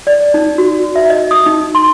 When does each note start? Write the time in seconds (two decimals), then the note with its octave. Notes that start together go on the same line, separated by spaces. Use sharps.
0.07 D5
0.34 D#4
0.58 F#4
0.96 E5
1.10 D#5
1.31 D#6
1.46 D#4
1.75 C6